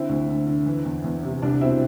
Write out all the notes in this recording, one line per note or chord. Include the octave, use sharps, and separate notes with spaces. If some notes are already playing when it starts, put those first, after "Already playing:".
Already playing: D3 C4 E4
D2
D3
D3
E3
E2
E2
C3
C2 D4
B2 C4 E4